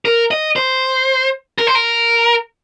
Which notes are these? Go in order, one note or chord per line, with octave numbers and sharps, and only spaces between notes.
A#4
D#5
C5
A#4
C5
A#4